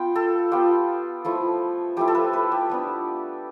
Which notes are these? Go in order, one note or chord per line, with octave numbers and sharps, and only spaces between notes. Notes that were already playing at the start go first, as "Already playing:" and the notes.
Already playing: B3 F4 G5
A4
B3 F4 G4
F3 A3 E4
F3 A3 E4 G4
A4
B4
B4
G4
G3 B3 D4